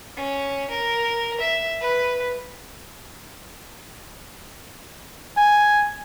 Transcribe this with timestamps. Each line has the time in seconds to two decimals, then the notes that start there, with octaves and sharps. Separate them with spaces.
0.17 C#4
0.70 A#4
1.40 E5
1.81 B4
5.37 G#5